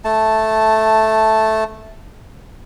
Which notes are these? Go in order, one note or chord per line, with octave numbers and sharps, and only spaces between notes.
A3 A5